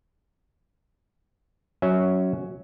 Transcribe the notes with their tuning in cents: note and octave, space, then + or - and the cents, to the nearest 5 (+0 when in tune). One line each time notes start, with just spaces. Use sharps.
F#3 +0 C#4 +0 E5 -25